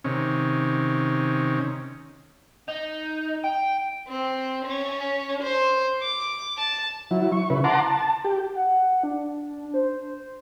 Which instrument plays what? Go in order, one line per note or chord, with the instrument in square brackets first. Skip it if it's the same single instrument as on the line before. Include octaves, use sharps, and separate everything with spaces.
[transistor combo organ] C3 D#3 C#4
[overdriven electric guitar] D#4
G5
[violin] C4
C#4
C5
D6
A5
[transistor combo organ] F#3 E4
C#6
C#3 E4 B4
F#5 A5 A#5 C6 D6
A5
G4
[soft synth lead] F#5
D4
C5